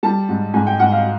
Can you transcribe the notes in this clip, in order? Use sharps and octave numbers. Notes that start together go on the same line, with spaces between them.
G3 A5
G#2
G#2 G#5
G5
G#2 F#5
F5